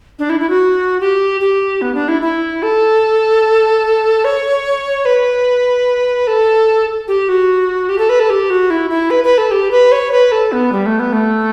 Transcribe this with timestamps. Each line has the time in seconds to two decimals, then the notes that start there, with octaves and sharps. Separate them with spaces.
0.19 D4
0.30 E4
0.40 E4
0.49 F#4
1.00 G4
1.41 G4
1.81 B3
1.95 D4
2.08 E4
2.22 E4
2.63 A4
4.25 C#5
5.05 B4
6.27 A4
7.08 G4
7.29 F#4
7.89 G4
7.98 A4
8.09 B4
8.20 A4
8.30 G4
8.50 F#4
8.70 E4
8.90 E4
9.10 B4
9.24 B4
9.38 A4
9.51 G4
9.71 B4
9.92 C#5
10.11 B4
10.32 A4
10.52 B3
10.72 G3
10.86 A3
10.99 B3
11.13 A3